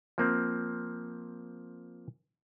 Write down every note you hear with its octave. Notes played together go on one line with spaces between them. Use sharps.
F3 A#3 C4